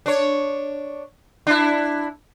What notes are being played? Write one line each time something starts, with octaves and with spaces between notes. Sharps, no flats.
D4 C#5
D4 E4